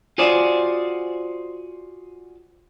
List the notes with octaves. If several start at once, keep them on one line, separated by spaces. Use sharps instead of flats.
F4 F#4 G#4 C5 D5